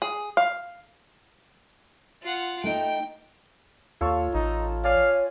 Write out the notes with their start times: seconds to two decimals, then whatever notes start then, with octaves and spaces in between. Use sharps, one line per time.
0.02 G#4
0.37 F5
2.23 F4 F#5
2.64 A3 D#4 G5
4.01 D#2 F4 A4 C#5
4.34 A1 D#4
4.84 C#5 D5 F5 G#5